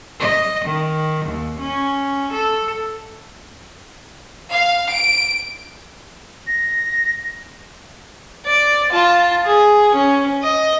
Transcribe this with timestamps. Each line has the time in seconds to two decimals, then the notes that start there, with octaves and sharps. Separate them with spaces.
0.19 D#5
0.66 D#3
1.27 D#2
1.60 C#4
2.34 A4
4.51 F5
4.91 D7
6.47 A#6
8.46 D5
8.91 F4 A5
9.45 G#4
9.95 C#4
10.42 D#5